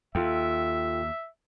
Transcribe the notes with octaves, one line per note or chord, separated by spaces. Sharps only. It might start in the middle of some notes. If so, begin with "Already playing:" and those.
D#2 F4 A4 E5 G5